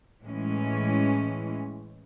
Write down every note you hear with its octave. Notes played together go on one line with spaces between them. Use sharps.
A2 E3 G#3 C#4